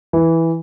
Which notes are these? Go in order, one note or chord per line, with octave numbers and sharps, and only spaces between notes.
E3